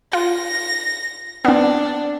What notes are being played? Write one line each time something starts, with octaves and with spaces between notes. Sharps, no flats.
F4 A#6
B3 C4 D4